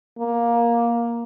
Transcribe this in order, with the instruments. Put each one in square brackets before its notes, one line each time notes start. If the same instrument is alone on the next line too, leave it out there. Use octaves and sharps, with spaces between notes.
[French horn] A#3